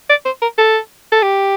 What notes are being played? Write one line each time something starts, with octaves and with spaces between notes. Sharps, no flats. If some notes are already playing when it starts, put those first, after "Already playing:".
D5
C5
A#4
A4
A4
G4